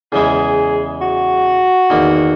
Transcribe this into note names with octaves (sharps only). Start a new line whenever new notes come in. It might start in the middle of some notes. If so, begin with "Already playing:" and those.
E2 C#3 E3 G#3 G#4
F#4
E2 D#3 A#3